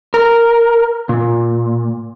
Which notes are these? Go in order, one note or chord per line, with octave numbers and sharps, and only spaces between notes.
A#4
A#2